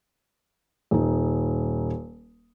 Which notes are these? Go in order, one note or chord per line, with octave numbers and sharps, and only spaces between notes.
D#1 D#4